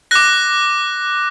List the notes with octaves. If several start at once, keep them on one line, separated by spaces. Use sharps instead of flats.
D6 F#6 A#6